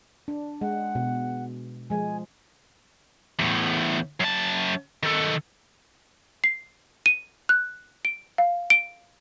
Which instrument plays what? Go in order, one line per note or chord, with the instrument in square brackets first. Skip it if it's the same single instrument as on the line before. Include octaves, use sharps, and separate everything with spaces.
[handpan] D4
[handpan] G#3 [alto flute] F#5
[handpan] B2
[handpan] F3 G#3 [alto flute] G#5
[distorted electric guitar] E2 A2
F#2 A5
D#3 A4
[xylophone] C7
D#7
F#6
D7
F5
D7